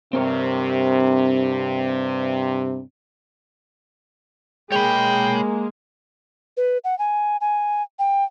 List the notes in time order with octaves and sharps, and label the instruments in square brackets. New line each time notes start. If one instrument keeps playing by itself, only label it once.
[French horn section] G2 C3 [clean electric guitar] C4 A#4 C#5
[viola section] G#3 A#3 [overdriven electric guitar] C#5 B5 [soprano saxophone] G5
[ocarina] B4
F#5
G#5
G#5
G5